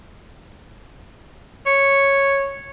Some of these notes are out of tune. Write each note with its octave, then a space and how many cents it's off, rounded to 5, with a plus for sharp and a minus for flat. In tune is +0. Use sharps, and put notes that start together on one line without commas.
C#5 -5